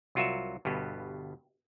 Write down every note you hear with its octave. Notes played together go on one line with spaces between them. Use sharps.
C2 F#3 F4 F#4 A#4 E5
G1 G2 B2 B3